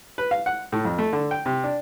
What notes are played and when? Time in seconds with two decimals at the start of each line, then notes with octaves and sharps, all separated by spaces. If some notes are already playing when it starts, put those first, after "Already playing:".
0.18 B4
0.31 F5
0.46 F#5
0.72 A2
0.85 F2
0.98 A3
1.13 D3
1.31 G5
1.46 C3
1.64 D4